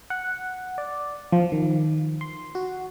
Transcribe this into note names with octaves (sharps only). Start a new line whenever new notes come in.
F#5
D5
F3
D#3
C6
F#4